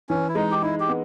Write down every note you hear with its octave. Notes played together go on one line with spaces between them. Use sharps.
E3 C#4
E4
G#3 D#4
G4
D#4 E4
G4
B3